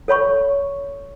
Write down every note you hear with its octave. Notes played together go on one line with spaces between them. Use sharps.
A4 C#5 B5 C#6